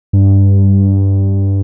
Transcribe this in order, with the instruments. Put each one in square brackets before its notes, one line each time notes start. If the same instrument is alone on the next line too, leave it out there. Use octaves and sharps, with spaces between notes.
[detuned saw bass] G2